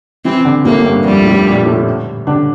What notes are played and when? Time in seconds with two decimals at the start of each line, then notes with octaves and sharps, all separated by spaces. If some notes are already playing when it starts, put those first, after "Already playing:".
0.25 E3 C4 E4
0.45 D3 D4
0.65 A2 A3 A#3
0.78 A3
0.85 G2 G3
1.05 F2 F3 G3
1.25 A2 A3
1.47 A#2 A#3
1.66 A2 A3
2.27 D3 D4